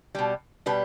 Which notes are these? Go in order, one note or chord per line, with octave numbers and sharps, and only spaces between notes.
B2 G3
B2 G3 B4